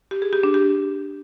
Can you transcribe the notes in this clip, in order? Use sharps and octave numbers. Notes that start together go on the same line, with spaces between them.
G4
G#4
G4
D4
G4